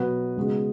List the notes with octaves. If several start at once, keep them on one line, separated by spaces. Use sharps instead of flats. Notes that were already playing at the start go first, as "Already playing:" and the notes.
Already playing: B2 F#3 B3 F#4 B4
C#3 G#3 B3 F#4